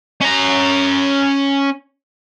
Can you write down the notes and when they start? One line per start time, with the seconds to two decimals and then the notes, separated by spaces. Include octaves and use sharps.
0.21 C#4 A#5